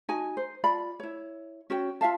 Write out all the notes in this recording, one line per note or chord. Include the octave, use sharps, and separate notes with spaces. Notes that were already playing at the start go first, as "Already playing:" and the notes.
D#4 F#4 G#5
C5
F4 D5 B5
E4 C#5
C#4 F#4 C#5 G5
F4 E5 F5 A5